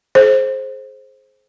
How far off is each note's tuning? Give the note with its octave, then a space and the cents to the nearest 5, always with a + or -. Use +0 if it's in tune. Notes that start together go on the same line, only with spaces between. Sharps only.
G#4 +35 C5 +10